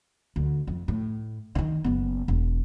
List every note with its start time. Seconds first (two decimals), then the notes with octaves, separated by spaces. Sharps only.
0.36 D2
0.67 F2
0.88 A2
1.55 D3 D#3
1.84 F#1 B3
2.28 E1